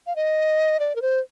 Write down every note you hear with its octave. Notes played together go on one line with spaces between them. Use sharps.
F5
D#5
D5
A#4
C5